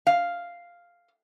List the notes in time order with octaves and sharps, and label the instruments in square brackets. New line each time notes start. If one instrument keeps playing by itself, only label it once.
[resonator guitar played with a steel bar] F5